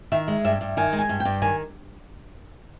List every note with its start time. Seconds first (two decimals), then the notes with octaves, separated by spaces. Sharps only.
0.12 D#3 E5
0.28 G#3
0.45 G2 E5
0.61 G2
0.77 D#3 G#5
0.93 G#3
0.99 G#5
1.09 G2
1.20 G5
1.25 G2
1.42 D#3 G#5